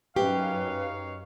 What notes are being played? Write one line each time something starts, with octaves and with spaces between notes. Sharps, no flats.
F#2 D#4 G4 B4 C#5 F5